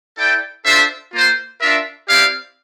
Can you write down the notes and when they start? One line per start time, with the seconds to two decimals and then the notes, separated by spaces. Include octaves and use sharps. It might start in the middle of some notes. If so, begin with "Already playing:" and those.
0.18 E4 A4 D5 G5
0.65 D4 F4 A4 C5 E5
1.12 A#3 F4 C5
1.60 D4 F4 A#4 E5
2.08 C4 E4 G4 D5 F5